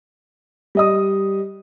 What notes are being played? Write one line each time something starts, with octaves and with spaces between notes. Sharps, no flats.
G3 D#5 D#6